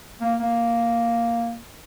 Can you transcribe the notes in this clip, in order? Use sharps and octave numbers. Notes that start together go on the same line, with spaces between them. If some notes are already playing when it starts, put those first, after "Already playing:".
A#3
A#3